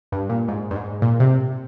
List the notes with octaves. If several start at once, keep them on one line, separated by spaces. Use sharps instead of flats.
G2
A#2
G#2
G2
G#2
A#2
C3